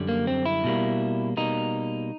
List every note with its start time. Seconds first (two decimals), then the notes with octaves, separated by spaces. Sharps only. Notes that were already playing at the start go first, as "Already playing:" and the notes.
Already playing: F#2 D3 G3
0.09 A#3
0.27 C4
0.45 E4
0.64 B2 G3 A#3
1.37 B2 G3 A#3 D#4